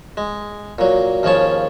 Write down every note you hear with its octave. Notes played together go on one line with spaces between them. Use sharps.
G#3
A#2 F#3
D#2 C#3 F3 C#5 A5